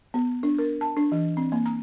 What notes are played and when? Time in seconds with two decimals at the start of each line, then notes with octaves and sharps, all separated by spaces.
0.14 B3
0.43 D4
0.59 A#4
0.81 A5
0.97 D4
1.12 E3
1.37 C4
1.52 A#3
1.66 A#5